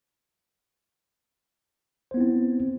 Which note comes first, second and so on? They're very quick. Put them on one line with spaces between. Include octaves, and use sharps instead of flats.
C5 B3 E4 C4